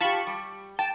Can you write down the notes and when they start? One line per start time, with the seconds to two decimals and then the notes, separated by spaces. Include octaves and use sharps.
0.01 F4 G4 A5 B5 C#6
0.27 G3
0.79 G5 A5